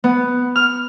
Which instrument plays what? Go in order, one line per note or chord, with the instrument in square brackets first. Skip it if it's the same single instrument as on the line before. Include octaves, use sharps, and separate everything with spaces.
[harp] B3
F6